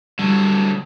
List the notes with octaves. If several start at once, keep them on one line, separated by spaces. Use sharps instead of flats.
D3 F#3 G3